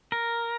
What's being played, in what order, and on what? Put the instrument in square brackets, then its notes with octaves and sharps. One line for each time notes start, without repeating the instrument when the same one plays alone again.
[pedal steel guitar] A#4